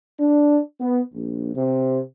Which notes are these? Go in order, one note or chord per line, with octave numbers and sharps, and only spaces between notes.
D4
B3
A#1
C3